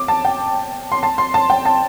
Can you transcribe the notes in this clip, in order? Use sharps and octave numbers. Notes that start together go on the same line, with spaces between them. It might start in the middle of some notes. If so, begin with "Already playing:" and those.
Already playing: D6
A5
G5
C6
A5
C6
A5
G5
A5